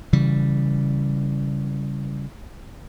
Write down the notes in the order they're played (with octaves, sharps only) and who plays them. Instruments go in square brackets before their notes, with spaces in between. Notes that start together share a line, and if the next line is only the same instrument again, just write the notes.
[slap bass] C#3 E3 G3